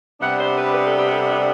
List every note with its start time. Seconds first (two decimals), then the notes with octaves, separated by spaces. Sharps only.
0.20 C3 G3 B3 D4 F#5
0.38 C5
0.55 B4
0.71 B4
0.85 A4
0.98 G4
1.10 A4